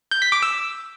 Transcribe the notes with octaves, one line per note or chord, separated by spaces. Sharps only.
G6
B6
D6
E6